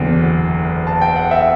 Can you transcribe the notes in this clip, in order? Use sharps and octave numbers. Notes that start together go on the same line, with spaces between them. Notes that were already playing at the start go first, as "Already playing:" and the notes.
Already playing: F#1 E2 D3
A5
G5
F#5
E5